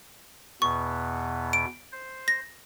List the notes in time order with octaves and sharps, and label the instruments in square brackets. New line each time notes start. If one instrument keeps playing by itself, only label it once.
[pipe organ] E2 B2 B3 [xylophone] C#6
[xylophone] D7
[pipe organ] C5
[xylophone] A#6